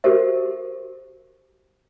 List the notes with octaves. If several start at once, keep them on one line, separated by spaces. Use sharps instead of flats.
F#4 G4 A4 A#4 C5 E5